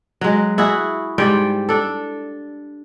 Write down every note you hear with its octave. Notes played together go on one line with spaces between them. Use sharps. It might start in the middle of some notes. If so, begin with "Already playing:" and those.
F#3 G#3
E4 F#4 G#4
G#2 G3 D5 G5
D4 A4